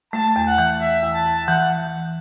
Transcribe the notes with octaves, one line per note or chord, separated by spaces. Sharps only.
A3 A5
E2
F#5
E3
E2 E5
E2
A5
E2
E3 F#5